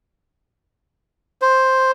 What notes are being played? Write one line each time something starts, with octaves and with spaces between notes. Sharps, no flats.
C5